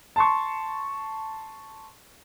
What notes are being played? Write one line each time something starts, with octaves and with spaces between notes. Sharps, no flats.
A5 C6 C#6